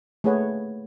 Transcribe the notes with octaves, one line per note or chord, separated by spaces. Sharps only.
A3 A#3 G#4 B4 C#5 F#5